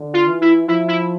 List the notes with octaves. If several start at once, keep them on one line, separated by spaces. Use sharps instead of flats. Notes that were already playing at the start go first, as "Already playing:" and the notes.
Already playing: D3
F4
E3
E4
F3 E4
E4